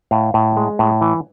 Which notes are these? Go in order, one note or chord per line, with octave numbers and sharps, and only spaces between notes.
A2 F5
A2
G#3
A2
E3